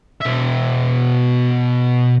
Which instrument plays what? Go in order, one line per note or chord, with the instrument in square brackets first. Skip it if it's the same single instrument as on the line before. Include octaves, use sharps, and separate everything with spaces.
[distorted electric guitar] B2 E5